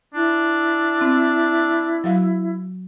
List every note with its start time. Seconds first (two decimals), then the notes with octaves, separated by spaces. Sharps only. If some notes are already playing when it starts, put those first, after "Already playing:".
0.14 D4 E4
1.01 C4
2.04 F#3 F#4 F5